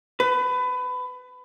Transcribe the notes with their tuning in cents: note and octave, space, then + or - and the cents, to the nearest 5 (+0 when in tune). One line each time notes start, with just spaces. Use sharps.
B4 +25